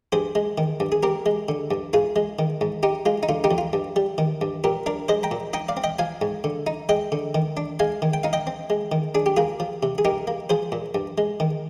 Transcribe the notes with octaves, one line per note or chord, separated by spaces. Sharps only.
G2 G#4 C5
G#3
D#3
G2
G#4
C4 G4 A#4
G#3
D3
G2
G#2 F4 G#4
G#3
D#3
G#2
D#4 G4
G#3 F4
D#4
D3 F4
D#4 G4
F2
F4
G2
G3
D#3
G2
A#2 G4 A#4
D4 A#4 D5
G#3 C5 D#5
G5 A#5
A#2
D#4 D#5 G5
D5 F5
C4
D#5 G5
F3 F5 G#5
G#2
D3
D#4
G#3 D#5 G5
D3
D#3
D4
G#3 F5 G#5
D#3
G5
D#4 F5
D#5 G5
C4
G#3
D#3
D4 G#4
G4
A#3 F4 G#4
F3
C3
G#4
D#4 G4 A#4
A#3
F3 G#4 C5
A#2
G2
G#3
D#3